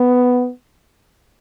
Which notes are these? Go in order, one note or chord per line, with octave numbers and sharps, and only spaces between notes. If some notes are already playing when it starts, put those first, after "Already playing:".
Already playing: B3